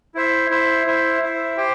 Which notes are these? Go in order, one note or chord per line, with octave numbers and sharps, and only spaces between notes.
E4 C5 E5
E4 C5 E5
E4 C5 E5
E4 C5 E5
G4 C5 G5